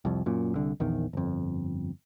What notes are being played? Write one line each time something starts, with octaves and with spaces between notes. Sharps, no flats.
C2 F2
F#2 A#2
C2 D3
A#1 E2 D#3
G1 F2